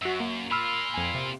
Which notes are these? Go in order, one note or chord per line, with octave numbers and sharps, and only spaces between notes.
F#2 F#4 E6
A#3
A#2 F4 B5 E6 F6
F2 G#5
C3